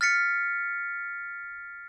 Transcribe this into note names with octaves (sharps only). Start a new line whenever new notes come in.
F6 A6 B6 C#7